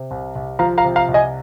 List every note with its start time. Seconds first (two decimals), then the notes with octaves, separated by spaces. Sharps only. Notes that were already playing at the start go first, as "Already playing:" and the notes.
Already playing: C3
0.11 C2
0.36 C2
0.59 F3 F5 A#5
0.78 F5 A#5
0.84 C3
0.96 F5 A#5
1.08 C2
1.14 D#5 G#5